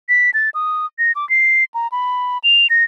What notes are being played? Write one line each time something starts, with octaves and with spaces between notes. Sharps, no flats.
B6
A6
D#6
A#6
D6
C7
A#5
B5
F7
A#6